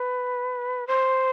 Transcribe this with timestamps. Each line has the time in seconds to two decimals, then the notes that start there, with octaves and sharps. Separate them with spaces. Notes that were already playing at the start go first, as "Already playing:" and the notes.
Already playing: B4
0.87 C5